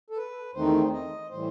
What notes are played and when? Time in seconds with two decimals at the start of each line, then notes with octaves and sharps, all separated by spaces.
0.10 A4
0.17 B4
0.55 E2 D#3 A3 C4 D#4 C5
0.93 D#5
1.31 A2 E3 G3 C5